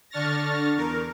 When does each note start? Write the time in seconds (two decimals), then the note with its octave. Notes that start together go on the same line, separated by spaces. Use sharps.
0.10 D3 D4 C#6 F6 A6 A#6
0.76 E2 A#4